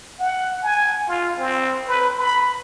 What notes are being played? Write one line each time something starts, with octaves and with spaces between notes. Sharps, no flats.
F#5
G#5
F4
C4
B4
B5